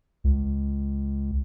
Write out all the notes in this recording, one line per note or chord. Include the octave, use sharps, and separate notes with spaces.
C#2